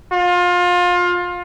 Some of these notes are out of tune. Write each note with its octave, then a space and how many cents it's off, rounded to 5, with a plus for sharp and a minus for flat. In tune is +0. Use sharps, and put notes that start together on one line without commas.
F4 +25